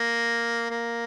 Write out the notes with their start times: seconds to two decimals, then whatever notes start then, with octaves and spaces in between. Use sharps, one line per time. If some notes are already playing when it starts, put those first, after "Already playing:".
Already playing: A#3
0.70 A#3